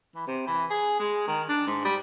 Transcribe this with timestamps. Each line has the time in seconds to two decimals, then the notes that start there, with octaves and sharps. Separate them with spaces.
0.15 E3
0.27 C3
0.47 E3
0.70 G#4
0.99 G#3
1.28 D#3
1.49 D4
1.67 G#2
1.85 G3